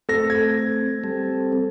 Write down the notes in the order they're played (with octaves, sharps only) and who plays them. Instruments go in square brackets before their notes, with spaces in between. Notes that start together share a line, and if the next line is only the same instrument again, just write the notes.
[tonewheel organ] A3 C4 [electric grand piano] A4 A#6
[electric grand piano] G#6
[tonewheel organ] G3 C4 A4